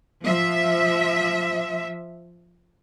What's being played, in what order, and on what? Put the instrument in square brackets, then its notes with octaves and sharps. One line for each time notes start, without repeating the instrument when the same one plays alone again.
[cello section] F3 E5